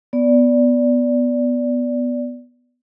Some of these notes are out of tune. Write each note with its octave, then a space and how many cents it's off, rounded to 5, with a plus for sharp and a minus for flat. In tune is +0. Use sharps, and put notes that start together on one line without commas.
B3 +0 D5 -10